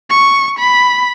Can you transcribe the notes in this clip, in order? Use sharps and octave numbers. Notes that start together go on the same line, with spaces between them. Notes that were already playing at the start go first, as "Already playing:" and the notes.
C#6
B5